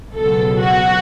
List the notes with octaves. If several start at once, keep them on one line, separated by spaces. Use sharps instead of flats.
C#2 B2 F#3 A4
F#4